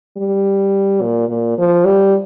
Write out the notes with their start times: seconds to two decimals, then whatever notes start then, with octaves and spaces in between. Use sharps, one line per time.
0.17 G3
1.02 A#2
1.29 A#2
1.58 F3
1.85 G3